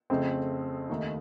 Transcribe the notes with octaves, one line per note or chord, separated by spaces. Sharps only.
F2 C#3 A3 C4
D#2 D#3 A3 D#4